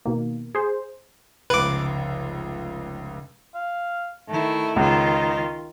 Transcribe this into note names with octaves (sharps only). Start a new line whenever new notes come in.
B2 D#3 A#3
G#4 C5
F1 C#2 B4 D6
F5
D#3 A3 E4
C#2 D#3 D#4 F4